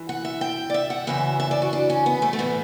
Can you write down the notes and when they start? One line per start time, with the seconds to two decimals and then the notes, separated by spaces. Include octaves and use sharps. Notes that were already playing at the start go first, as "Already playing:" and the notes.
Already playing: G2 E3
0.09 F#5
0.25 E5
0.41 G5
0.70 D5
0.74 E5
0.90 F#5
1.07 F#2 C#3 E3 E5
1.40 E5
1.51 D5
1.62 F#4
1.73 D4
1.90 C#4
2.06 B3
2.22 A3
2.33 A3
2.39 A2 E3 B3